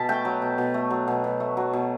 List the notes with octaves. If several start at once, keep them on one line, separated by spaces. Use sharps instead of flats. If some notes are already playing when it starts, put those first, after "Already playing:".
Already playing: B2 A5 B5
A3 G5
F#3
B2
B2
A3
F#3
B2
B2
A3
F#3
B2